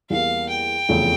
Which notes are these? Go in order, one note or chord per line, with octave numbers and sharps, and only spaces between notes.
E2 E3 G3 A#3 F5
G5
F1 E2 C#3 F3 A3